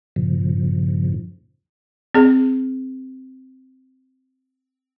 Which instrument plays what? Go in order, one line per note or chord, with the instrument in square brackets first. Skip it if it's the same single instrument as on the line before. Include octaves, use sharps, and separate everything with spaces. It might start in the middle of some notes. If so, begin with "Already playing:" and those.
[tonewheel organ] G2 A#2 C#3 F3
[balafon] C4 G#4